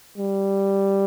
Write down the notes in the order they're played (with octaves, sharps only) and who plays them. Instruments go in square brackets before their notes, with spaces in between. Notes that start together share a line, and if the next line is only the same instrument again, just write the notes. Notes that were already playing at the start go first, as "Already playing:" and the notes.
[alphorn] G3